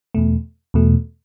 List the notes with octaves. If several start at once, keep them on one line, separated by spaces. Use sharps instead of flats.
E2 B2 A3
E2 B2 A3